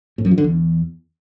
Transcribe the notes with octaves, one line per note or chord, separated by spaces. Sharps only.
A2
F#2
F3
D3
E2